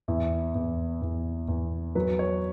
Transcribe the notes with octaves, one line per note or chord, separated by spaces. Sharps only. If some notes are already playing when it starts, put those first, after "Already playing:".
E2 E4
E2
E2
E2
F#3 B4
C#5